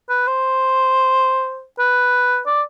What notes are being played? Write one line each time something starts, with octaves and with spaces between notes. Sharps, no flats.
B4
C5
B4
D5